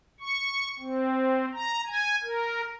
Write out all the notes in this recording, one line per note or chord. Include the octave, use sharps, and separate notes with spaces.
C#6
C4
A#5
G#5
A#4